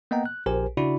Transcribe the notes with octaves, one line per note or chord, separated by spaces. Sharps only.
A#3 B3 D#5 F#5 G5 A#5
F#6
A#1 G4 A#4 C5 G#5
C#3 D4 E4 F#4 D5 B5